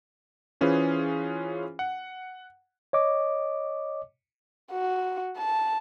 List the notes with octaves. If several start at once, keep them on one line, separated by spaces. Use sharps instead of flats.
E3 C#4 F4 G#4 B4 C5
F#5
C#5 D#5 D6
F#4
A5